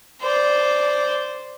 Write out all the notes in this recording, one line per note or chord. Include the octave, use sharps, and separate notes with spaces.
C5 D5